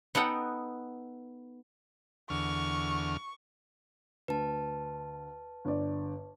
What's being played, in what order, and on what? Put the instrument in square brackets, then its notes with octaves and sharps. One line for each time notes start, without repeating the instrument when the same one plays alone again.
[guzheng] B3 D#4 A4 F#5 G5
[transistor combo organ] E2 D3 F6 [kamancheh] C#6
[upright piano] D2 [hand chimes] B4 A5
[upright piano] G1 D3 D5